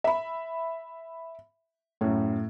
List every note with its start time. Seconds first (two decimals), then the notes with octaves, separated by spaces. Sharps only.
0.04 E5 B5
2.01 F#2 A2 C#4